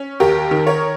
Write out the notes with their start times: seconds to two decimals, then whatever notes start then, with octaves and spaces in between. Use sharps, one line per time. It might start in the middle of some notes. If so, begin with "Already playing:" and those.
Already playing: C#4
0.20 D#2 G4 A#4
0.51 D#3
0.67 A#4 C#5